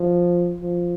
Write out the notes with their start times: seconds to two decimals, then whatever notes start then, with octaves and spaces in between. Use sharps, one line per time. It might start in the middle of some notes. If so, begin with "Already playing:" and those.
Already playing: F3
0.61 F3